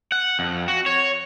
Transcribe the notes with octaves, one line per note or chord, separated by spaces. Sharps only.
F#5
F2
F#4
C#5